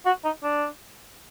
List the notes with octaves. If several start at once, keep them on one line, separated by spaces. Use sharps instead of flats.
F#4
D#4
D4